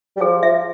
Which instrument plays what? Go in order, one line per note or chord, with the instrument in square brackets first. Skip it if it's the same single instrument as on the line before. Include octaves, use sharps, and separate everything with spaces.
[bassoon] G3
[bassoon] F3 [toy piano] G#4
[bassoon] F3 [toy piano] E5